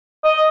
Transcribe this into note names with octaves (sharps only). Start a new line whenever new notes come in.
D#5